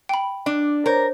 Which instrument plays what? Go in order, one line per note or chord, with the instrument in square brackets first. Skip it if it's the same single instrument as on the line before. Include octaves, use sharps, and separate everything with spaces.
[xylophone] G5 B5
[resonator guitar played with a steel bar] D4
[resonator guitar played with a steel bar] A#4 [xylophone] C5 C#5